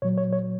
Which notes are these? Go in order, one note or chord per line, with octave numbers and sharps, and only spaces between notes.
A#2 F#3 C#5
C#5
C#5